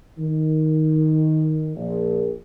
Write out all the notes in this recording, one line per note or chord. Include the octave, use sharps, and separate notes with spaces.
D#3
A#1